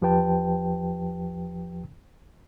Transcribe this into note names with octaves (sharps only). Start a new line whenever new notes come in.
E2 F3 G4 B4 G5 A5